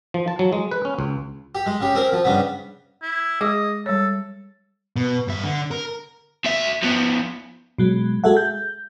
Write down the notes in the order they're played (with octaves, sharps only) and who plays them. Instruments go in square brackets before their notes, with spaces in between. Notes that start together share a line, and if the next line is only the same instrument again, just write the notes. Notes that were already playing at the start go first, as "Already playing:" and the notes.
[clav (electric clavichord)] F3
A5
F#3
G#3
B4
C#4
C#2
[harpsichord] G4
G#3
C#3 G4
C4 G#4 A#4
F3
G2 C#3 B3
[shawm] E4
[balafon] G#3 G#4 D6 [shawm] D#5
[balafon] G3 C#5 [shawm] A4
[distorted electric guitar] B2
G2 E5
D3
A#4
[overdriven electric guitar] D2 E5
F3 B3
[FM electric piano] B2 F#3 G#3
G#3 F#4 G#4 A4 E5 F#5
G6